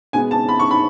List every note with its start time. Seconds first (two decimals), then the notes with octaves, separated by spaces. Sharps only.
0.13 B2 G#3 B3 G#5
0.31 A5
0.49 B5
0.60 C#6
0.71 B5